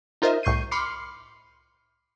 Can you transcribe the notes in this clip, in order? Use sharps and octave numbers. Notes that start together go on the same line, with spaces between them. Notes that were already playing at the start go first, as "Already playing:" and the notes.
D#4 F4 A#4 C5 D#5 E5
C2 A2 C#6 G6 C7 D#7
B5 C6 D6 F6 C7 C#7